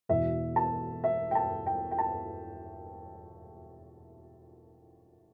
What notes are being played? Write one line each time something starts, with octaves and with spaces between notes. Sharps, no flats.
E1 E2 B2 E5
A5
E5
G5
A5
G5
G5
A5